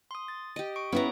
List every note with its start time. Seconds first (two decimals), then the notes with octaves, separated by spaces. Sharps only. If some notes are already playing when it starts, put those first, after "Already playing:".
0.11 C6 D#6
0.28 A6
0.56 G4 D#5
0.76 C#6 D7
0.92 B3 C#4 E4 B4 C#5 A#5